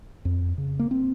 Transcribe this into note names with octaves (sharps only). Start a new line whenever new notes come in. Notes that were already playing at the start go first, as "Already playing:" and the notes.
F2
C#3
A#3
C4